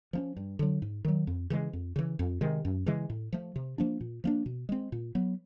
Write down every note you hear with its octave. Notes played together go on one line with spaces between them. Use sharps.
F3 A#3 C#4
G2
D3 F#3
G#2
D#3 F#3
F2
C#3 E3 G#3
F2
C#3 E3
F2
C3 D#3 G#3
F#2
C#3 E3 G#3
A2
F3 A3
C3
F3 A#3 D4
A#2
F3 A#3 D4
B2
G#3 C4
A#2
F#3 B3